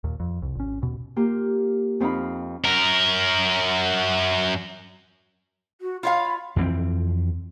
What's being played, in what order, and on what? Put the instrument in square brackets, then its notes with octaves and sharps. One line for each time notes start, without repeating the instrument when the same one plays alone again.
[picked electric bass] D#2 A#2
F2
C2
G#1 C#4
D#2 B2
[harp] A#3 F4 G4
F2 C4 D#4 F5 B5
[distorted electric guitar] F#2 A#4
[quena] F#4
[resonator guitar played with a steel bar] F4 C#5 F5 [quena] B5
[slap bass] F2 E3 A#3 C4